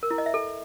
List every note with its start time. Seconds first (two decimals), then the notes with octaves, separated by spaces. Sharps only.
0.03 A#4
0.10 E4
0.18 D#5
0.26 E5
0.34 A4